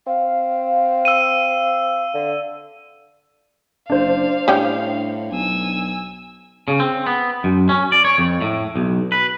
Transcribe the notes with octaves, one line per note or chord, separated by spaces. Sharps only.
C4 F5
E6 D#7
D3
F#1 D4 C5 F5
A2 G3 C#4 G5
B1 G#5 E6
C#3
C4
B3
F#2
C#4
D5
C#5
F2
A2
B1
B4